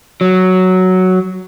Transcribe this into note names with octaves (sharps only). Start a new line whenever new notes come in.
F#3